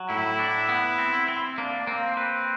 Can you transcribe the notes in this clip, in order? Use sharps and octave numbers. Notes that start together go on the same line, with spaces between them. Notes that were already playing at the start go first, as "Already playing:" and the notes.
Already playing: F#3
A2 E4
D4
B3
C4
C4
A#3 D4
A#3 C4
C4 B4